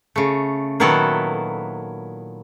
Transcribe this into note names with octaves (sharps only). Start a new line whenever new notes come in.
C#3 A3
A#2 D#3 F#3 B3 E4 A4